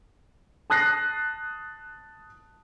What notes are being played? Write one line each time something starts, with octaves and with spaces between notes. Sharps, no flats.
A5 D#6 F#6 A#6 C7